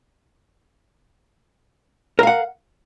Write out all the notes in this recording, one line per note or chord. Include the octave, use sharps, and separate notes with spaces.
A#4 F5 F#5